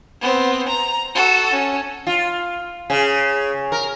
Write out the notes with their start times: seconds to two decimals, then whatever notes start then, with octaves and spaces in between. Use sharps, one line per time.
0.21 B3 C4
0.69 A#5
1.15 F#4 A4
1.53 C#4
2.07 F4
2.90 C#3
3.72 A#4